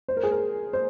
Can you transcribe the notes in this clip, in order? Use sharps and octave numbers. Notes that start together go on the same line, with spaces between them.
C5
A#4
G#4
A#4
C5